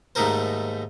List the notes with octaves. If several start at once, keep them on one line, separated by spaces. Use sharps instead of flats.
D#2 G#2 A3 D#4 A#4 C5